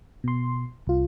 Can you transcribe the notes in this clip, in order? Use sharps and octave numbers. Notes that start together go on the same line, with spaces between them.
B2 C6
C2 F4